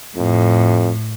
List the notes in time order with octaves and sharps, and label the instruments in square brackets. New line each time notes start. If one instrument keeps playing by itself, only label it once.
[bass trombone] F2 [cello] A2